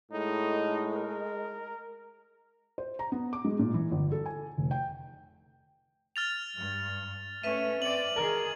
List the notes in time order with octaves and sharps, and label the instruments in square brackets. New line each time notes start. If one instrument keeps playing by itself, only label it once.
[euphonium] A2 [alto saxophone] G#3 [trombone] D#4
[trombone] A#4
[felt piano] C5
A#5
B3
D6
G#3
A#2
E3
G1
A4
G#5
F1
G5
[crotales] F6 A6 F7
[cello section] G2
[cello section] A3 C#4 [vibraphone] B4 E5 [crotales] D#7
[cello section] C4 D5 [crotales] F#7
[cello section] D#3 G#4 [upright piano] A#4